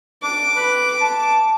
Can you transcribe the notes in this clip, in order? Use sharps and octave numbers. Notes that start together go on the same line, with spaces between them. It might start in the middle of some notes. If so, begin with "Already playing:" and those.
D4 D6
B4
A5